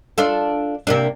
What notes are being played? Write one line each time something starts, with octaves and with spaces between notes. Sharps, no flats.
D4 F4 A4
C3 A#3 D4